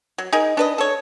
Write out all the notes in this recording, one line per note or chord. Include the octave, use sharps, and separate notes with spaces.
F#3
D#4 G#4 A#4
D4 B4 D#5
A4 C#5